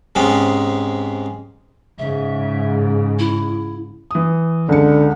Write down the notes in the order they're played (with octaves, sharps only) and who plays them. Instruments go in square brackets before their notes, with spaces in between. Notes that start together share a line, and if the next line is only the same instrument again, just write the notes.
[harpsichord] G#2 C3 G#3 B3 C#4
[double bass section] G#2 C#3 [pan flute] E5
[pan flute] E4
[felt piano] E3 D#6
[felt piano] C#2 C#7 [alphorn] D3